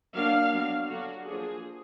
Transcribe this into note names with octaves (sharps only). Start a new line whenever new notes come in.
F#3 A#3 D4 F5
F#3 B3 D4
D3 F#3 D4 F#4
F3 A#3 D4 G#4